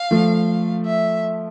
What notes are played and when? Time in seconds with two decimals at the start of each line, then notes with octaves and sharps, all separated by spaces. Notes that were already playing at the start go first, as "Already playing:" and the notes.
Already playing: F5
0.11 F3 A3
0.86 E5